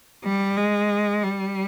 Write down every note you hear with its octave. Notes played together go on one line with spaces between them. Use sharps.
G3
G#3
G3